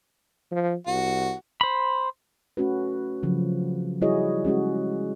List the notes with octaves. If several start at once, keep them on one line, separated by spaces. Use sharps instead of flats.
F3
C2 F#4
C5 B5
A3 C#4 F#4 B4
C#3 F3 F#3
G3 E4 F#4 G#4 C#5 D#5
G#3 C#4 F#4 G#4